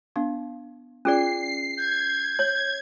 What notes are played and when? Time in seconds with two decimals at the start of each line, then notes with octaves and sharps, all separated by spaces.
0.16 B3 D4 F5
1.05 C#4 F4 G#4 D5 C7
1.78 G6 G#6
2.39 C#5